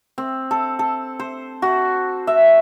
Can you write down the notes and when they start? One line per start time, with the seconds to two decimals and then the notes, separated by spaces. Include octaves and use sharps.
0.18 C4
0.51 A4
0.79 A4
1.19 C5
1.62 F#4
2.27 E5